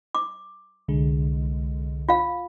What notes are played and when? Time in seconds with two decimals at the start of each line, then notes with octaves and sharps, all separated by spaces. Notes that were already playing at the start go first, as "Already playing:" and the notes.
0.15 D6
0.88 C2 D3 G#3
2.09 F4 F5